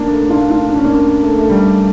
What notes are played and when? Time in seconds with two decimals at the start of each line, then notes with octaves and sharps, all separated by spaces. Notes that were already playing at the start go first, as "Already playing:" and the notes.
Already playing: A#3 D4
0.10 A3
0.29 D4 F4
0.50 D4 F4
0.69 D4
0.77 C#4
0.84 A#3 D4
1.23 A3
1.38 A3
1.49 G3